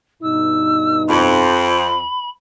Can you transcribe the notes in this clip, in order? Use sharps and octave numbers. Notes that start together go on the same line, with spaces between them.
G2 B2 D#4 E6
F2 B5